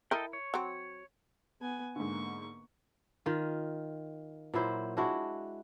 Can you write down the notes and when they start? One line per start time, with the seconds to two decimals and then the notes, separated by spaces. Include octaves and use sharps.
0.11 E4 A4 A#4 D#5 G5
0.33 C#5
0.54 F#3 C4
1.61 B3 G#5
1.96 G#2 D3 A#3 C#6
3.26 D#3 F4
4.54 A#2 F#3 E4 C5
4.97 G#3 D4 E4 F#4